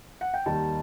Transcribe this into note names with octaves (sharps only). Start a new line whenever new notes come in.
F#5
G5
D#2 D#3 G3 A5